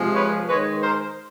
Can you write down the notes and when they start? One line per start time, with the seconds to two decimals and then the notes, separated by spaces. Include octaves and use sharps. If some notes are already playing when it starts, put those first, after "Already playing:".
Already playing: C3 F3 G#3
0.15 B4 C#5
0.49 D#3 G#3 B4 C#5
0.83 A#4 C5